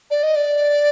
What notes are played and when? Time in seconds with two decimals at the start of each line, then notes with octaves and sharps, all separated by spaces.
0.11 D5
0.23 D#5
0.35 D5